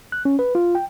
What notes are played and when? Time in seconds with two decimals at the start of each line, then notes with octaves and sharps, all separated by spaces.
0.12 F#6
0.25 C#4
0.39 B4
0.55 F4
0.75 G5